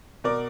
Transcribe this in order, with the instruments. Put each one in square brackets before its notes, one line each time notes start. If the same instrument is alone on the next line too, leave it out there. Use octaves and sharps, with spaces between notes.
[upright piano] B2 A#4 D5